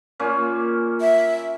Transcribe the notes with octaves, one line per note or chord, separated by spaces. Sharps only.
A#2 A#3 C#4
E5